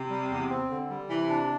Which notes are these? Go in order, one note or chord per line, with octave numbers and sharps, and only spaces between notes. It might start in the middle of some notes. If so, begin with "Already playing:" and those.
Already playing: C3
G3
E2
C4
D3
G3
C3 E3
D4